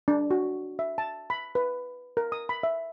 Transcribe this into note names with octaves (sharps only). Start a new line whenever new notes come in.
D4
F#4
E5
A5
B5
B4
A#4
D#6
B5
E5